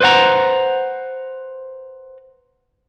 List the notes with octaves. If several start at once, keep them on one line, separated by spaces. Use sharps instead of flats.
B4 C5 D5 F#5 A#5